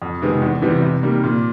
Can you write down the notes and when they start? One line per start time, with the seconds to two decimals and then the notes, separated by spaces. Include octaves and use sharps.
0.02 F2
0.22 C3 D#3 G#3 B3
0.42 E2
0.62 C3 E3 G3
0.82 C3
1.03 D#3 G3 A#3
1.23 A#2